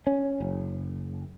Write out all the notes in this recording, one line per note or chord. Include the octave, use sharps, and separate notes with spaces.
C#4
F#1